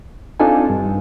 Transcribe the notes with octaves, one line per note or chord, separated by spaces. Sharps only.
C4 D4 D#4 F4 A4 G#5
G2